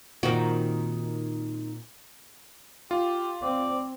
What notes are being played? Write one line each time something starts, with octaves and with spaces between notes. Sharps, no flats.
A#2 D#3 C4 F#4 F#7
F4 G4
C4 D5